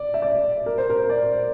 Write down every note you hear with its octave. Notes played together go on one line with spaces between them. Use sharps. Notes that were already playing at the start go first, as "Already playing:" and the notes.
Already playing: D5
E5
D5
A#4
C5
A#4
D5